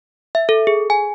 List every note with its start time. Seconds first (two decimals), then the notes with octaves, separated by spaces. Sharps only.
0.35 E5
0.49 A4
0.67 G#4
0.90 G#5